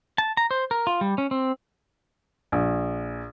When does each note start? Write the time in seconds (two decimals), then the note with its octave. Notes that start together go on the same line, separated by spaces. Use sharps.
0.18 A5
0.37 A#5
0.51 C5
0.71 A#4
0.87 F4
1.01 G3
1.18 C#4
1.31 C4
2.52 A#1